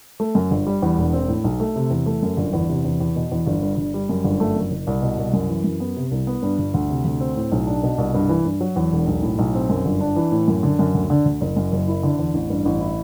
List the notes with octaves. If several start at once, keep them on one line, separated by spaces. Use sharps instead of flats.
A3
F#2
G1
G3
E2
E1
C4
A2
B1
A3
C3
E2
A3
F#2
G1
E2
C3
E2
E2
B2
E2
G1
G2
G1
G3
F#2
G1
A3
F#2
F#1
C2
B2
C2
F#2
E3
F#2
B3
C3
C2
B3
G2
G1
D2
C3
D2
C4
A2
B1
D4
B2
C2
G2
E3
G2
F#3
E2
E1
B1
A2
B1
C4
F#2
G1
D4
E3
A2
F#2
D3
F#2
D2
D3
D2
F#1
F#2
F#1
E4
D3
E2
A1
G2
A1
E4